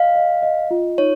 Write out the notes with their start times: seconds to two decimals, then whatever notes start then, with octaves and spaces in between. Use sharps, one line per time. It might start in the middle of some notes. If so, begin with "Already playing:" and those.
Already playing: D#5 F5
0.15 D#5
0.42 D#5
0.71 F4
0.98 D#4 C#5